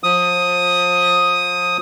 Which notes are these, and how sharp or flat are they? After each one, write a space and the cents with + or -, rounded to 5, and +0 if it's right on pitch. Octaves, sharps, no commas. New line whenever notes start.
F3 +30 D#6 +5